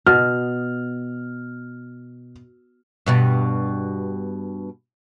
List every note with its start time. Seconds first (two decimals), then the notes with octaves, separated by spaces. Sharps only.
0.06 B2 F6
3.06 G2 B2 G3